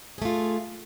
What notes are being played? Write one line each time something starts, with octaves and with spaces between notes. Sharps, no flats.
A3 F4 G#4